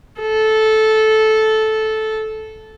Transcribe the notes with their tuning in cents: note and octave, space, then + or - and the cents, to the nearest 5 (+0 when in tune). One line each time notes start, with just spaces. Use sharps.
A4 -10